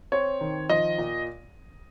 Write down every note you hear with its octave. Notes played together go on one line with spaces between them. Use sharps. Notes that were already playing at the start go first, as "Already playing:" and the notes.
C4 C#5
D#3
F3 D#5
A#2